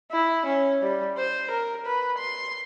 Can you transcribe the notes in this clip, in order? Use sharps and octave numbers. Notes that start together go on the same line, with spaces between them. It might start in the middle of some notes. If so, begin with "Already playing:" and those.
E4
C#4
G3
C5
A#4
B4
C6